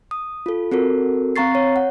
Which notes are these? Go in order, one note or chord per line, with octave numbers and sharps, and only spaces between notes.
D#6
F4 A4
C4 F#4 A4 A#4
C4 F5 A#5 C#6 A6 C7
C#5
F#5